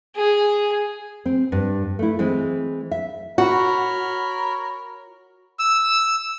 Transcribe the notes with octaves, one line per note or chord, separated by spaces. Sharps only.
G#4
C4
G2
A3 E4
E3 G#3 C4
E5
F#4 A#4 C#5 B5
E6